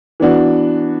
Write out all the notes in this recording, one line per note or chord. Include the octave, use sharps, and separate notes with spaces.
E3 B3 D4 F#4